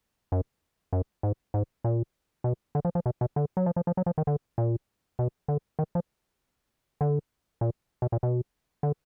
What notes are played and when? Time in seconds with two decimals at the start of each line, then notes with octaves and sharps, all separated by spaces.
0.32 F#2
0.93 F#2
1.23 G#2
1.54 G#2
1.84 A#2
2.44 B2
2.75 D3
2.85 F3
2.95 F3
3.06 B2
3.21 B2
3.36 D3
3.57 F#3
3.66 F3
3.76 F3
3.87 F3
3.97 F#3
4.06 F3
4.18 D#3
4.27 D3
4.58 A#2
5.19 B2
5.48 D3
5.79 D#3
5.95 F3
7.01 D3
7.61 A#2
8.02 B2
8.12 A#2
8.23 B2
8.83 D3